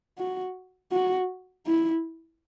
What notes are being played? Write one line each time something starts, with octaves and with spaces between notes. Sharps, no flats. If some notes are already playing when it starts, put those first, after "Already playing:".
F#4
F#4
E4